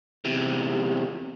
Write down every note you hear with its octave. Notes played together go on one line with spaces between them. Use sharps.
E2 C3